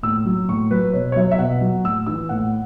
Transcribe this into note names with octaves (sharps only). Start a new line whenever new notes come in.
A2 E6
F#3
A2 C#6
F#3 B4
B2 C#5
C#5
F#3 E5
E5
B2 F#5
F#3
A2 E6
E3 E6
A2 F#5